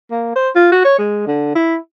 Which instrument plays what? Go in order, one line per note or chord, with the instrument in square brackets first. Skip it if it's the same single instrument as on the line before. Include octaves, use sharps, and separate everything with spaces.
[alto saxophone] A#3
C5
F4
F#4
C#5
G#3
D3
E4